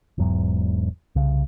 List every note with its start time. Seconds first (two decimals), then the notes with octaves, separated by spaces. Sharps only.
0.18 E1 E2 G#2 F#3
1.15 C2 C#3